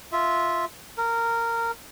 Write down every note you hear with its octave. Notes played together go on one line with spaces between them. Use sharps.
F4 E5
A#4